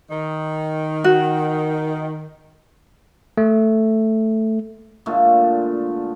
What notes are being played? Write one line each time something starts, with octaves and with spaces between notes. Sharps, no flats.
D#3
F#4
A3
A#2 D3 G#3 A3